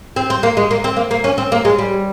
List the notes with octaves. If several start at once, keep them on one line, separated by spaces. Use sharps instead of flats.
C4
C4
A#3
G#3
A#3
C4
A#3
A#3
C#4
C4
A#3
G#3
G3